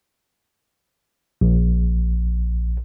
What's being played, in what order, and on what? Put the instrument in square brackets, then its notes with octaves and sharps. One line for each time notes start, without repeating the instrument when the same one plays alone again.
[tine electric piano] A#1